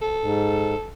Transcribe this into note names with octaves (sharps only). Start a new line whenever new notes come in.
A4
G#2